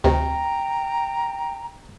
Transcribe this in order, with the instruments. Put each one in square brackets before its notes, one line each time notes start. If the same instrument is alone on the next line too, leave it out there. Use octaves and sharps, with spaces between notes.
[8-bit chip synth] D2 [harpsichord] C3 D#3 [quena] G5 [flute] A#5